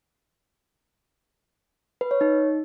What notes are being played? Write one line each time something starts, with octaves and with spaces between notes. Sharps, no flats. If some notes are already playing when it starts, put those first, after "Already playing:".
B4
C#5
D#4